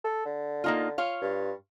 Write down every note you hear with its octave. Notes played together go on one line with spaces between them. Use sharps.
A4
D3
A#3 D#4 F4
F4 C#5 F5
G2